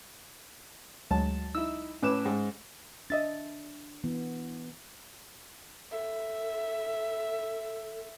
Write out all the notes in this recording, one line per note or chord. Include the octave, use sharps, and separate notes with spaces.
D2 F#3 G#3 A5
D#4 E4 E6
A2 C#4 B4 D6 E7
G#2
D4 D#5 E5 A6
E3 B3
A4 E5